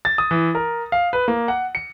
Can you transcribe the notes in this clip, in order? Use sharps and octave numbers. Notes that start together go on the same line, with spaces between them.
A6
D#6
E3
A#4
F5
B4
A#3
F#5
C#7